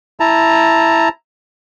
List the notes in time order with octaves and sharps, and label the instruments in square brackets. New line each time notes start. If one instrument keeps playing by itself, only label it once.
[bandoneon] E4 A5 A#5